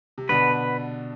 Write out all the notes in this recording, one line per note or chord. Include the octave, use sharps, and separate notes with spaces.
C3
B2 D3 B4